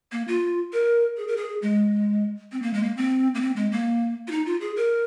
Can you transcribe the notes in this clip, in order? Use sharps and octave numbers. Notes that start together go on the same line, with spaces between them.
A#3
F4
A#4
G#4
A#4
G#4
G#3
C4
A#3
G#3
A#3
C4
A#3
C4
G#3
A#3
F4
D#4
F4
G#4
A#4